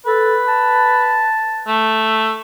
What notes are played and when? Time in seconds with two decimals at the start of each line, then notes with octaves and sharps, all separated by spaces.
0.06 A4 B4
0.48 A5
1.67 A3